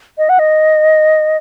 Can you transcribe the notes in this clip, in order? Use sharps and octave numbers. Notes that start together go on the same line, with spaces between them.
D#5
F#5
D#5